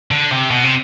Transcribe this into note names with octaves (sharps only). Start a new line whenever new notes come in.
D3
C3
B2
C3